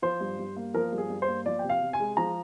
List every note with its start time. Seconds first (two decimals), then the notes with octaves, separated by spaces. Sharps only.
0.02 F3 C5
0.21 G2
0.39 G2
0.57 A#3
0.74 F3 A#4
0.92 G2
0.98 G#4
1.10 G2
1.22 C5
1.28 A#3
1.46 F3 D5
1.59 C3 G5
1.69 F5
1.82 C3
1.93 G#5
2.00 G#3
2.17 F3 A#5